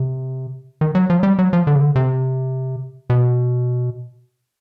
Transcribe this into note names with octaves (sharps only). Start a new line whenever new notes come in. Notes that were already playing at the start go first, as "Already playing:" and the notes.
Already playing: C3
D#3
F#3
F3
F#3
G3
F#3
F3
D3
C#3
D3
C3
B2